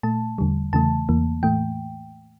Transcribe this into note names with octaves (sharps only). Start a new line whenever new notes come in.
A#2 A3 A5
E2 D3 G3
E2 C#3 E3 A3 A5
E2 E3 A#3
A2 E3 A3 G5